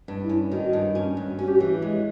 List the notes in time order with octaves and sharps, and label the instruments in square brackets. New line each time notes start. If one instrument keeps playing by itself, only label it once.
[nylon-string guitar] G2
[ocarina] E4
[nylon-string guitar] C#4
[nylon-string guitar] D#3 [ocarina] F#4
[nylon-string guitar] G2
C#4
G2
[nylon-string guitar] C#4 [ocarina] F#4
[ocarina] G4
F#4
[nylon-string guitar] E3
G#3